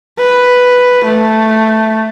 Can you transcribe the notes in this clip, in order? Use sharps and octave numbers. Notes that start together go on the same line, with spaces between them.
B4
A3